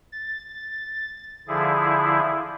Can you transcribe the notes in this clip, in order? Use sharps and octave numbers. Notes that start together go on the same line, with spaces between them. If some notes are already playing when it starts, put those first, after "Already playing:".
A6
D3 F3 E4 G#4